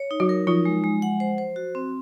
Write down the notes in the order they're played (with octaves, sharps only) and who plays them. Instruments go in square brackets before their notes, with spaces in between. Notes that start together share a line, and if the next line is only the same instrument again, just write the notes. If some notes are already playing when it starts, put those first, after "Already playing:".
Already playing: [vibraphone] C#5
D#4
[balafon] F#3 F#4
[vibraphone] A#4
[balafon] F3 F4 [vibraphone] D#4
[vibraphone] G#3
G#3
F#5
C5
C5
F#4
C4